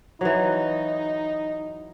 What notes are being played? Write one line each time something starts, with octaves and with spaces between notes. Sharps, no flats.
E3 F#3 D#4